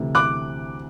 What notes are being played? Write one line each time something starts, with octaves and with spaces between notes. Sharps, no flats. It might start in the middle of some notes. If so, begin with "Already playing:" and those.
Already playing: D2 C3 E3 A3
D6 F#6